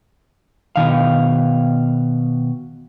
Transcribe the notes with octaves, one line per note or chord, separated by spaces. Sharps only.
B2 D#3 F5